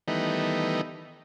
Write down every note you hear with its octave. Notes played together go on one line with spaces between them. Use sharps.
D#3 E3 G3 A3 B3 D#4